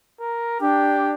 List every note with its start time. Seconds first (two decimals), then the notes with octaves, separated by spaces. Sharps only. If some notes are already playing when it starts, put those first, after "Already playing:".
0.20 A#4
0.61 D4 G4